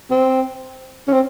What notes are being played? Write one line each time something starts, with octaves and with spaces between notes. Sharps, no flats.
C4
C#4
C4